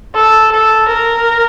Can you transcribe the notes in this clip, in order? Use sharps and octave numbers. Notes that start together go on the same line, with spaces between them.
A4
A4
A#4